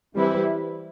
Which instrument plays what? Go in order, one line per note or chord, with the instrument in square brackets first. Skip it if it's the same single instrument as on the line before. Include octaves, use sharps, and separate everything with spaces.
[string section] E3 G3 C4 E4 B4